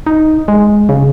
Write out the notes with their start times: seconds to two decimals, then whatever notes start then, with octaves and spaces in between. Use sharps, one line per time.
0.06 D#4
0.48 G#3
0.89 C#3